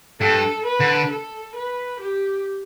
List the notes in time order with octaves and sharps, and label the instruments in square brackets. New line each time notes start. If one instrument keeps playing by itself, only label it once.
[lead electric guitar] G2 [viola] A4
[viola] B4
[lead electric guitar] D3
[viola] A4
B4
G4